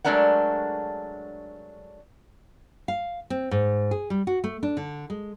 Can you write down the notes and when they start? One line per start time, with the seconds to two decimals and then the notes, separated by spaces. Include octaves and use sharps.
0.05 F#3 G#3 A3 D4 A#4 F#5
2.88 F5
3.30 C4
3.51 G#2
3.91 G#4
4.10 G3
4.27 F#4
4.44 A3
4.63 D4
4.77 D3
5.10 G#3